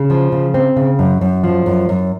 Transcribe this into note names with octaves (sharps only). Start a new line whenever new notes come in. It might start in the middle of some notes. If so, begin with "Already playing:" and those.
Already playing: C#3
F3
C#3
C4
C#3
F#2
F#2
F3
F#2
F#2